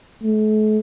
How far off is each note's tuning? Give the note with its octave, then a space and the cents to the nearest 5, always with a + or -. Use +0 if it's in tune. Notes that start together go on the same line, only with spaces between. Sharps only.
A3 -40